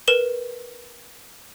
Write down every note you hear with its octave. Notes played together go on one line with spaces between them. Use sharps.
A#4 B4 E7 G7